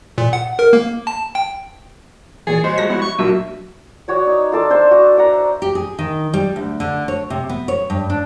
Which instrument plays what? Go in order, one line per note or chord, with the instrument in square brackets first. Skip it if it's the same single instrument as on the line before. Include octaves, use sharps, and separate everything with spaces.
[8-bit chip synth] A#2
F#5
A#4
A#3
A5
G5
[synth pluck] A#2 E3 [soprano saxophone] G#4 [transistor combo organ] C#5 A5
[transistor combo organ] G3 F#4 C#5 [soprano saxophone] C5 [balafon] D#5
[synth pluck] F3 G#3 A#6
[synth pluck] B3 [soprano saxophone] E4
[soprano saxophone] C#6
[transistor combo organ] A#2 G3 A#3 [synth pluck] F#3 D4 F4 [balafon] F#4 [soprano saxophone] E5
[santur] F#4 C#5 D5
D#4
F4 A4 D5
D4 C5 E5
F#4
D5 E5 F#5 A#5
[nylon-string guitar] G4
G#4
D#3
G3
D2
D3
C#5
C3
B3
C#5
G2
D4